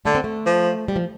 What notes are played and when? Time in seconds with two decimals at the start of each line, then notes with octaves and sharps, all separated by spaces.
0.05 D3 A3
0.15 C4
0.24 A3
0.46 F3
0.88 G3
0.96 F3